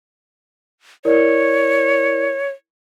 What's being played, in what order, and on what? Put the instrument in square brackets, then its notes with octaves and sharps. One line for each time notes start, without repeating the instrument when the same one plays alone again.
[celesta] E4 A#4 D5 [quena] C#5